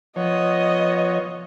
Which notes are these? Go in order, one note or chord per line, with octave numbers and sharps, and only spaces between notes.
F3 B3 C#5 D#5